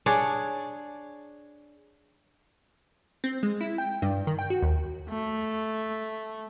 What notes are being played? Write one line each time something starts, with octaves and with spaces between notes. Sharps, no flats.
D4 G#4 C#5 D5
C4
G#3
E4
G5
G2
D#3
G5
F#4
D#2
A3